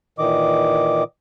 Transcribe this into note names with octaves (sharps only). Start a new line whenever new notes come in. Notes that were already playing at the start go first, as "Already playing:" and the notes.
A#2 D#3 E3 D#5 D6